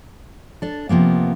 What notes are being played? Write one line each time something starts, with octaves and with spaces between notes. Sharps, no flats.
D4 A4
C3 F3 A#3 B3